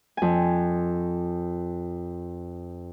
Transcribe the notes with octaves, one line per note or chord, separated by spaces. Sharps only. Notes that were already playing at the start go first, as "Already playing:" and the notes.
F2 G#5